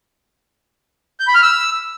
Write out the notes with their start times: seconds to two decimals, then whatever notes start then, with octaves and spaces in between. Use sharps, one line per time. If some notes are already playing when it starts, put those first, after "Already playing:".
1.20 G6
1.27 B5
1.35 F6
1.42 E6